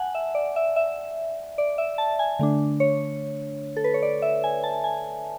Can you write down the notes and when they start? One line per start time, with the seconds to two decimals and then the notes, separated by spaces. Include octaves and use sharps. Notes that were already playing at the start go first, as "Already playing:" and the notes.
Already playing: F#5 G#5 A5
0.15 E5
0.35 D5
0.56 E5
0.76 E5
1.58 D5
1.78 E5
1.98 A5
2.19 G#5
2.39 D3 A3 D4
2.80 C#5
3.77 A4
3.84 B4
3.94 C#5
4.02 D5
4.22 E5
4.44 G#5
4.64 A5
4.84 G#5